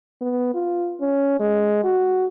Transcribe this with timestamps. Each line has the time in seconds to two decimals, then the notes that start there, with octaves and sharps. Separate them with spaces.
0.21 B3
0.54 F4
1.00 C#4
1.39 G#3
1.84 F#4